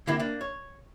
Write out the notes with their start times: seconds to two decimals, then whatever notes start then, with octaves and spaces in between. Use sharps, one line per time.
0.07 D3 E3 A#3 C4 E4 G4
0.20 A#3 D4
0.41 C#5